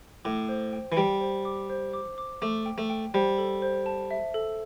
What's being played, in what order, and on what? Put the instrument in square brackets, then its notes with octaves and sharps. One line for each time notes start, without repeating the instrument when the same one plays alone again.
[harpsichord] A2 [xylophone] D6
[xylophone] C5
G5
[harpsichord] E3
[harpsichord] G3 [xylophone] G5
[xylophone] C5
D6
C5
D6
D6
[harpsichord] A3 [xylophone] D6
[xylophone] G5
[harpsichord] A3
[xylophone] G5
[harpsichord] G3 [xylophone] C5
[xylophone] A4
C5
A5
E5
A4